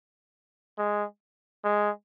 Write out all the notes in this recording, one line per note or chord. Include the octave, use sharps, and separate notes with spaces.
G#3
G#3